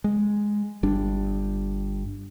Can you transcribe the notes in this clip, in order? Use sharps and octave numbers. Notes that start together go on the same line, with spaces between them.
G#3
G1 G3 D4